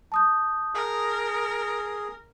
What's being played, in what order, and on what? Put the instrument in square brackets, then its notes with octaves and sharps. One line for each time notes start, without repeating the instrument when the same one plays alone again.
[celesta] A5 D#6 G6
[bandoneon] G#4 [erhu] A#4